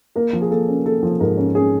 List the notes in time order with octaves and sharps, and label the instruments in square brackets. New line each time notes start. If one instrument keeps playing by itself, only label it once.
[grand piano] A#3 A#4
F3
G#4
A#3 A4
C#4
A#3 A4
F3
G#2 A#4
C#4
C#4 G#4